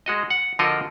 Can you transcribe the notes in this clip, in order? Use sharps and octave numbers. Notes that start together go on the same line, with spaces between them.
G#3 F#4 D#5
F#5
D3 F3 F4 F#4 A#4 D#5